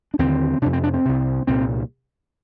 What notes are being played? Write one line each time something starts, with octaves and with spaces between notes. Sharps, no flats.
D4
D#2 D3 C4
F2 C3 D4
C4
D4
C4
C2 C3
C2 A#2 C4